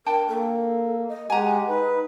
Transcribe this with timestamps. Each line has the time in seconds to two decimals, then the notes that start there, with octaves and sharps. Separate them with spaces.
0.06 D4 A#4 G5 A5
0.28 A#3 A4
1.08 D#5
1.30 G#3 G4 F#5 G#5 A#5
1.68 D#4 B4